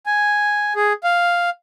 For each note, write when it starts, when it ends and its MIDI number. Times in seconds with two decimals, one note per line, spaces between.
0.06 0.73 80
0.76 0.93 68
1.03 1.50 77